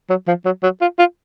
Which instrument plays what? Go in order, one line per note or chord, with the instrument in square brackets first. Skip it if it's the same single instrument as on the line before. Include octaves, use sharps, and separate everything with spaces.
[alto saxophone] F#3
F3
F#3
F#3
F4
F4